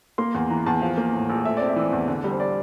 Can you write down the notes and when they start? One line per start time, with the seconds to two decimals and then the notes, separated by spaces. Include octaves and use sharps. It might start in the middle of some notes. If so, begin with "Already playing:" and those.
0.18 A#3 C6
0.34 E2
0.50 E3 A#5
0.66 E2 A5
0.82 F3 F5
0.98 A#3
1.13 A2
1.30 A#1
1.44 A3 E5
1.57 C4 D5
1.69 E5
1.76 E3
1.93 E2
2.08 D3
2.24 G3
2.31 C5
2.40 D5